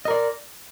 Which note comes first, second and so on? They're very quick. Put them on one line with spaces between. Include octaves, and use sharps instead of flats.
D#5 A#4 D5